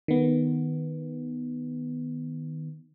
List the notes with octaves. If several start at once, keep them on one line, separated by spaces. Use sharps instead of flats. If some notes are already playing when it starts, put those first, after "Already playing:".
D#3 B3